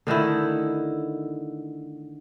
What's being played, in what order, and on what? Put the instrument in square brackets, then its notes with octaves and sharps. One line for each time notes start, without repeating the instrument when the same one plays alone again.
[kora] D3 D#3 A3 E4